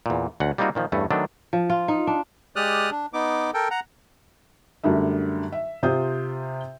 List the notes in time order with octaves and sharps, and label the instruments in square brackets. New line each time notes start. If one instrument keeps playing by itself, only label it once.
[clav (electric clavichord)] E2 A#2
D2 C#4 F#5
G3 A#3 C4 D#4 F4 F#4
A#2 D#3 F3
E2 G2 A3 C#4
D#3 F#3 A3 B3 D4 A4
[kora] F3
F4
D#4
D4
[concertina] G#3 G4 D5 D#6 F6 F#6
D4
B3 D#4 D6
A4 A#4 G5
F#5 A#5
[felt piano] F#2 D3 G3 A3
E5
C3 F4 G4 C5 D#6 G6